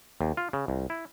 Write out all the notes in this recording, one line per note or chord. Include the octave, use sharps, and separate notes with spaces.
D#2
F4
C#3
C2
E4